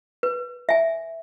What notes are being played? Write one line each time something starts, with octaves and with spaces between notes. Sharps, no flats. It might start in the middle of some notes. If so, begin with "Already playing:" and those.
B4
E5 G#5